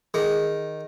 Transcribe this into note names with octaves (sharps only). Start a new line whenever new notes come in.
D#3 G#4